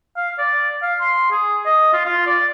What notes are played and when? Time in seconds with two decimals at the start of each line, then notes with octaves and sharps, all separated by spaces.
0.16 F5
0.38 D5
0.82 F5
1.01 C6
1.31 G#4
1.66 D#5
1.93 F4
2.05 F4
2.27 D5